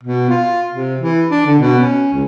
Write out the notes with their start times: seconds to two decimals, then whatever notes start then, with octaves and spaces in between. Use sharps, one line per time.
0.03 B2
0.30 F4
0.73 C3
1.01 E3
1.31 D4
1.46 D3
1.59 B2
1.79 C#4
2.14 C#2